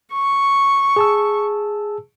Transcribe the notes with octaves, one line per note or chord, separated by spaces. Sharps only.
C#6
G#4 A5 E6